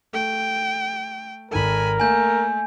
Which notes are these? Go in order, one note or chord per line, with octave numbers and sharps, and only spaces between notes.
A3 G5
G#1 D#3 A4 A#4 G#5 B5
A3 A#3 G#5 G6